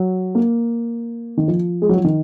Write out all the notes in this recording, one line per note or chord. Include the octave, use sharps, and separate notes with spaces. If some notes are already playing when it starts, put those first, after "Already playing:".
Already playing: F#3
A#3
D#3
F3
G#3
F#3
F3
D#3